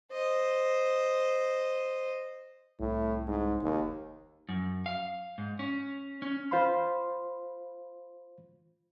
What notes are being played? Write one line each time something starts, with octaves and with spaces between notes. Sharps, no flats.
C5 D#5
C2 A2
G#2
F1 D#2
F#2
F5
G#2
C#4
C#4
F4 C5 F5 B5 C6